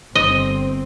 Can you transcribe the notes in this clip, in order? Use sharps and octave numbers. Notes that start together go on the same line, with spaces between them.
G1 C4 D#5